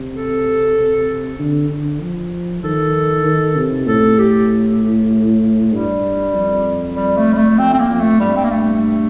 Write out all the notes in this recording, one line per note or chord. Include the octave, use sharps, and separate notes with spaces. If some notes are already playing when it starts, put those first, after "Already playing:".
Already playing: C3
A4
D3
D3
F3
D#3 A4
D#3
C3
A2 A4
G4
G2 G3
F2
G3
A3
G3
A3
F2 C4
C4
A#3
F2
A3
G2 G3
C4
A#3
A3